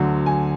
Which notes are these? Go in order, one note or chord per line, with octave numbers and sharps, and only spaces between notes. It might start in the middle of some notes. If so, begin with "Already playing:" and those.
Already playing: D2 D3 F#3
G#5